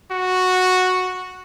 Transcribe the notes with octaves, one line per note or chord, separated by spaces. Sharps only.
F#4